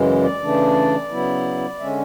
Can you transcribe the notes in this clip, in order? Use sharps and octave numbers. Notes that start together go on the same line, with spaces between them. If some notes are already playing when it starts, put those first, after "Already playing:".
Already playing: F#2 C#3 E3 G#3
D5
C#3 E3 A3 D4
C#3 F#3 B3 E4
D3 G#3 C#4 E5